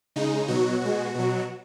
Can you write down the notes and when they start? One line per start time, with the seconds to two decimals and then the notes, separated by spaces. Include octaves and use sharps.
0.16 C#3 G#3 D#4
0.48 B2 F#3 F#4
0.81 B2 G#3
1.15 B2 F#3